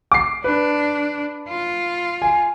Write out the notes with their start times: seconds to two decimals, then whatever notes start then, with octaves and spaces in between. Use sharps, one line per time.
0.12 D6 C7
0.44 D4 B4
1.48 F4
2.22 G#5